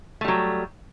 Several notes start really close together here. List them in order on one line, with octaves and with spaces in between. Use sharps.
A3 G3 F#3